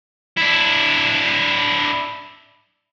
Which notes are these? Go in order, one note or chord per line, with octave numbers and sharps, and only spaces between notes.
D4 E4